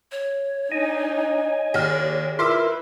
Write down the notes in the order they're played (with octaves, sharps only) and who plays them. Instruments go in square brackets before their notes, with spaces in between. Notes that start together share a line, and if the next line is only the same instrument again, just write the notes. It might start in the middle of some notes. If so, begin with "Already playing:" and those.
[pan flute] C#5
[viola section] D4 D#4 [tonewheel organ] D#5 G#5
[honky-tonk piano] D#2 F6 [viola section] E4 G#4 D5
[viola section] E4 B4 [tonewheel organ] F4 A#4 E5 [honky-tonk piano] C6 D6 E6